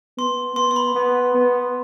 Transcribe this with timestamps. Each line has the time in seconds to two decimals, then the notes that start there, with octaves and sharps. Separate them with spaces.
0.18 B3 C6
0.56 B3 C6
0.71 C6
0.76 B5
0.95 B3
1.35 B3